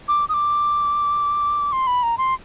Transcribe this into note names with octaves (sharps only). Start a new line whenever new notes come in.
D6
D#6
D6
C6
B5
A#5
C6